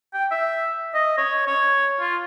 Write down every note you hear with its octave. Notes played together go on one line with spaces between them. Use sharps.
G5
E5
D#5
C#5
C#5
F4